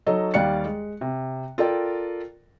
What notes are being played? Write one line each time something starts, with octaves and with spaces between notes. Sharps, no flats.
F#3 D#4 A4 C#5 D#5
D#2 G3 D5 F5 F#6 C#7
G#3
C3
F4 A4 A#4 D5 G5